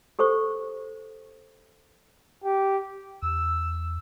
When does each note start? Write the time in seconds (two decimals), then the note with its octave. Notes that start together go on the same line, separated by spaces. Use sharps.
0.19 G4 A4 C5 C#6
2.44 G4
3.23 E2 E6